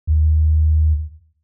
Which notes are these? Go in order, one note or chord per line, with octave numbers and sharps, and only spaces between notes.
D#2